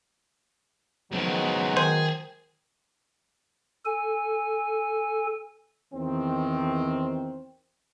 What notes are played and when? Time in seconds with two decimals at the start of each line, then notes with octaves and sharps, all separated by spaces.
1.12 C#2 D#3 F3 F#3 G#3 B3
1.77 D#3 G#4 C5
3.85 A4 G#5
5.94 E2 D#3 C4